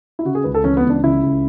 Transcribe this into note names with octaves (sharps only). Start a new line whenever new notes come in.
E4
C#3 F#4
G#4
C#2 B4
A4
E3 C#4
B3
C#2
D4
C#3 E4
C#2